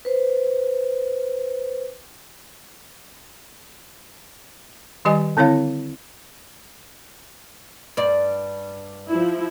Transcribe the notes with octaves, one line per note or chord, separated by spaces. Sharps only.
B4 C5
D#3 G3 G4 D#5 G#5
D3 C4 E4 C#5 F5
G2 D5
F3 E4